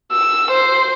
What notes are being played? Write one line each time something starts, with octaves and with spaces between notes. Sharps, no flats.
E6
C5